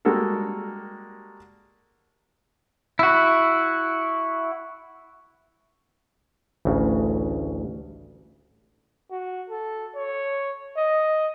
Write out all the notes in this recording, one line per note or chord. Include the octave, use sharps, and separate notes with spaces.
G3 G#3 A#3 F#4 A4 A#4
E4 F#4
A1 D2 C#3
F#4
A4
C#5
D#5